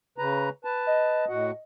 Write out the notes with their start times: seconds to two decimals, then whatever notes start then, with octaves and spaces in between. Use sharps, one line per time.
0.18 C#3 B4 A#5
0.65 B4 A5
0.87 D#5
1.29 A2 F#4 F#5